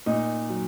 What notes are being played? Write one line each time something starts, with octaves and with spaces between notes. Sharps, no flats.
A#2 D#4
F#3